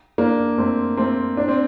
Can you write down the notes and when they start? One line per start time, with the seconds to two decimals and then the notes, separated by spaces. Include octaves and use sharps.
0.18 A#3 D4
0.58 A3 C4
0.97 A3 C4
1.37 D4
1.48 C4